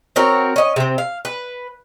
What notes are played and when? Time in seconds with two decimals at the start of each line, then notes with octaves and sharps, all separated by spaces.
0.16 C4 F#4 A#4 C#5
0.56 C#4 D#5
0.76 C3 C4
0.98 F5
1.25 B4